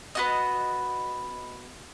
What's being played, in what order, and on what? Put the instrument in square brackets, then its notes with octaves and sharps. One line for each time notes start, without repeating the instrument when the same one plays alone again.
[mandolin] B3 F#4 D#5